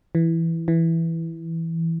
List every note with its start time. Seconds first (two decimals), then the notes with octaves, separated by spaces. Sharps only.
0.15 E3
0.68 E3